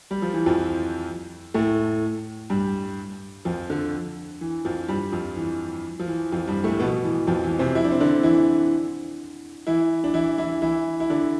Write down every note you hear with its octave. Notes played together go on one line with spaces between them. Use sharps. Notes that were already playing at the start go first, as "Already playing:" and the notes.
G3
F3
E3
F2 F3
A2 A3
G2 G3
F2 F3
D3
E3
F2 F3
G2 G3
F2 F3
E3
F3
E3
F2 F3
G2 G3
A2 A3
B2 B3
E3
F2 F3
E3
C3 C4
E4
D4
C4
D3 D4
E3 E4
E3 E4
D4
E3 E4
E3 E4
E3 E4
E4
D3 D4